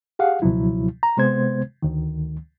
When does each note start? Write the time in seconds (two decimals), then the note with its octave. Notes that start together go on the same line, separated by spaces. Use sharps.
0.19 G4 G#4 F5 F#5
0.42 C#2 B2 F3 F#3 E4
1.03 A#5
1.17 C3 G#3 B3 C5 G#6
1.83 D2 D#3